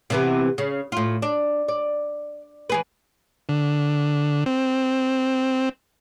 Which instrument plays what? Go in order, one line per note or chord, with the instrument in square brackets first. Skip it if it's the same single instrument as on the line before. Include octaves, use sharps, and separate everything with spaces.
[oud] C3 E3 B3
C#3
A2 F4
D4
D5
E3 G#4 B4
[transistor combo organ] D3
C4